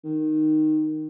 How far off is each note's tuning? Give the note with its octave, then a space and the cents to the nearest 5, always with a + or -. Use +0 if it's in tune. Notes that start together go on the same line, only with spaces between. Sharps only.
D#3 -10